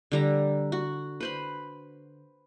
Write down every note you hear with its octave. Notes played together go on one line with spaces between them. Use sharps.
D3 G3 A#5
F#4
B4 C5 B5